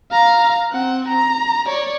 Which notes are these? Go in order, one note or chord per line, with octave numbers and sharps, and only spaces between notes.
F5 A#5
C4 F#5
A#5
C#5 D5